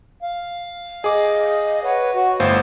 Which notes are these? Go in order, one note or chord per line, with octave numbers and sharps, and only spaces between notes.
F5
G#4 D#5 D6
B4 C#5 F#5
F#4
G1 A2 C5 F5